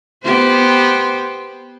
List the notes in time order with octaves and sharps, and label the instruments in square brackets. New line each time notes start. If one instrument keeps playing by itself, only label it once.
[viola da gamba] B3 G4 C5